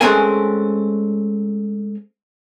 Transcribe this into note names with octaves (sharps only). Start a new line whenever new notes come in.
G#3 A3 C4 C#4 A#4 G#5